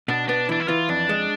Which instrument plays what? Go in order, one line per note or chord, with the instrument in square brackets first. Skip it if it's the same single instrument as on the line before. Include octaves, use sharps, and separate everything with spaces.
[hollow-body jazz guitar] B2 [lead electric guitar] D4
[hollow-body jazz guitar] B3 [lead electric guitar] D4
[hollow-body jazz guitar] E3 [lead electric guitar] D4
[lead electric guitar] E4
[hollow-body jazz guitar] E3 [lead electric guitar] F4
[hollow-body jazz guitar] F2 [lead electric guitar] D4
[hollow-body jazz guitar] G#3